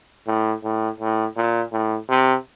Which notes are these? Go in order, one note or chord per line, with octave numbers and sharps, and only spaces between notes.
A2
A2
A2
A#2
A2
C3